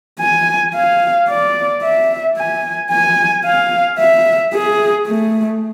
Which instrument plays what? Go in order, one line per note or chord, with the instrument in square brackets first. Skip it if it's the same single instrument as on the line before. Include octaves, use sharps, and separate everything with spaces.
[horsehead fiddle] G#5
F5
D5
E5
G#5
G#5
F5
E5
G#4
A3